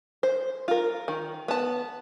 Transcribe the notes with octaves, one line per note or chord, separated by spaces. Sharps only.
C5
F4 A#4
D#3
B3 A5